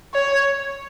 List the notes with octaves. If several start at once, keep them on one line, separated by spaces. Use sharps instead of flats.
C#5